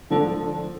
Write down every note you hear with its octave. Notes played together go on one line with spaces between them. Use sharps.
D3 F3